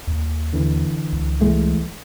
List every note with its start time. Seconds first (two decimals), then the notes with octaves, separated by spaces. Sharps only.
0.08 D#2
0.53 D3 E3
1.13 C#2
1.41 E3 G#3 A3